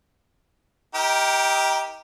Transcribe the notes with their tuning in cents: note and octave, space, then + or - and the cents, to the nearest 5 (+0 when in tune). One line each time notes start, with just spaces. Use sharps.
D#4 +30 G4 +0 A#4 +0